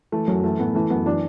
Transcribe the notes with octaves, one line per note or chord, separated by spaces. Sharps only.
E3 A3
F#2 F#3
E3 A3
A2 B3
E3 A3
F#2 B3
E3 D4